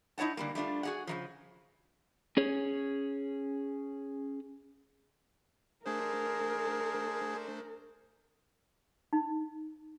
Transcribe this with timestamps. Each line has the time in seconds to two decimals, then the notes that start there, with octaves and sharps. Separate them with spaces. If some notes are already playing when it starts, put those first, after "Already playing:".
0.18 D#4 E4 C#5 F#5 A5
0.37 D3 G3 A#3
0.55 G3 A3 D4 F4
0.83 F#4 G#4 F#5
1.07 C#3 E3 F3
2.37 C#4 G#4 C#5
5.86 A3 D4 G#4 A#4 C5
9.13 D#4